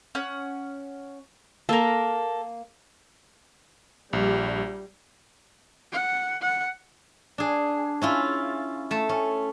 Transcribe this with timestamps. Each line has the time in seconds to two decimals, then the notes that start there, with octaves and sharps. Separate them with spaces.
0.15 C#4 F#5
1.69 A#3 A4 A#4
4.13 A#1 G3
5.93 F#5
6.42 F#5
7.38 D4 G#4
8.02 C#4 E4 F4
8.91 A3 A5
9.09 C#4